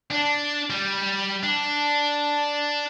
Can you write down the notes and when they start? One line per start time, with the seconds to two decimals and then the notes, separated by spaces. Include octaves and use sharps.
0.11 D4
0.70 G3
1.43 D4